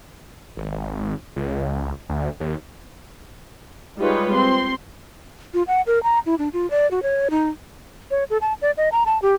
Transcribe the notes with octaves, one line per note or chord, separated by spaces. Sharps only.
G#1
C#2
D2
D#2
G3 G#3 D#4 F4 B4 C#5
C4 C6
F4
F#5
A#4
A#5
E4
D4
F4
D5
F#4
C#5
D#4
C#5
A4
A5
D5
D#5
A#5
A5
G4